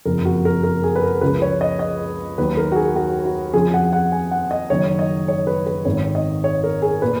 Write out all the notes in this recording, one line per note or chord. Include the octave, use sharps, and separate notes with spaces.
F#1 F2 F3 A#4
F#4
A#4
A#4
G#4
B4
A#4
C#2 C#3 F3 B4
C#5
D#5
D#5
D#2 D#3 F#3 B4
A#4
F#4
G#4
F#4
F#4
F2 C#3 F3 G#4
F#5
F#5
G#5
F#5
D#5
F#1 F#2 D#3 F#3 C#5
D#5
C#5
B4
B4
G#1 G#2 D#3 C#5
D#5
C#5
A#4
G#4
A#2 B4